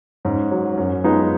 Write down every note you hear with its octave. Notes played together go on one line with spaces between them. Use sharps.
G#2 C#4
F#3
F#2 C#4
F3 G#3 B3 D#4